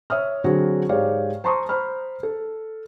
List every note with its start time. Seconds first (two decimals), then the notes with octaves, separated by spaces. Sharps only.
0.10 C#5 E5 D#6 F6
0.44 D3 F#3 C4 F#4 G#4
0.89 G#2 G#3 G4 C#5 D5 F5
1.44 C5 A5 A#5 C6 C#6 D#6
1.69 C5 A#5 B5 F6
2.23 A4